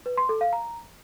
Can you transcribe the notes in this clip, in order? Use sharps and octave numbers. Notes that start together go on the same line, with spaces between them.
B4
C6
A4
F5
A#5